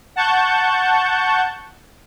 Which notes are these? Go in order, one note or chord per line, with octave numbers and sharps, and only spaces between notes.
F#5 A5 C#6 G6